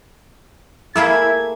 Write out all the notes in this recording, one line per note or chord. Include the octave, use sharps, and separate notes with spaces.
A3 A#3 E4 G#4 G#6